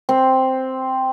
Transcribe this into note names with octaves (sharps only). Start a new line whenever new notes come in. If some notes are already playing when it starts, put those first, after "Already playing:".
C4